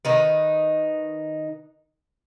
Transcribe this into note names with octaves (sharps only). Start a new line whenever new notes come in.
D#3 D#4 B4